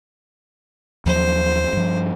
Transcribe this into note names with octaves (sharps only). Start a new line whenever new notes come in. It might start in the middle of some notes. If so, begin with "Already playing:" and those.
D#2 F3 F#3 C5
G2 F3